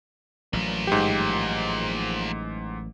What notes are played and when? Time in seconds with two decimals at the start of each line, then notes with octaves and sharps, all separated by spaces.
0.53 A1 F3 F#3 A#3
0.87 G#2 G4